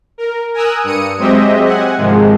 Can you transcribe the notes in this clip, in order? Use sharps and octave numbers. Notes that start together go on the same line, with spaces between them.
A#4
A#4 G#5 A#5 D#6 E6 F#6
G2 D#6 C#7 D#7
F#3 G#3 C4 G4 D#5 E5
F#5 G#5
G#2 C3 D#3 F3 G#3